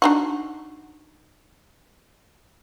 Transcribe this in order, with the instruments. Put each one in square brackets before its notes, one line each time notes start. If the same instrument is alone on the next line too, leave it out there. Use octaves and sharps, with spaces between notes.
[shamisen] D4 D#4 F#4